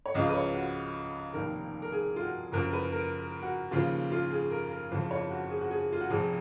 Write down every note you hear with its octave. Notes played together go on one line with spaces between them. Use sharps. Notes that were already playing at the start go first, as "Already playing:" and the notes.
C#5
C#2 C#3 F3 D#5
B4
C#5
F#4
F1 D#2 D#3 A#4
A#4
G#4
F4
F#4
F#1 F#2 F3 A#4
B4
A#4
F#4
D#2 C#3 F3 F4
F4
G#4
A#4
A#4
F#1 F2 C#3 F3
C#5
F#4
G#4
F#4
G#4
F4
F#4
F1 F2 F3 G#4